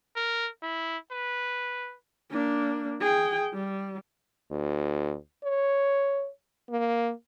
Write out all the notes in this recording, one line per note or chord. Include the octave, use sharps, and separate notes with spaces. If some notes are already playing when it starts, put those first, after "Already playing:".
A#4
E4
B4
A#3 D4
G#4 G5
G3
D2
C#5
A#3